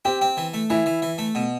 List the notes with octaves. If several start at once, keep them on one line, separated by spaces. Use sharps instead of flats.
C4 G4
C4
E3
A3
E3 E4
E3
E3
A3
B2